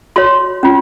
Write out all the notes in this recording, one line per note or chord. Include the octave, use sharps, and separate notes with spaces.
F#4 C#5 C6
C#4 F4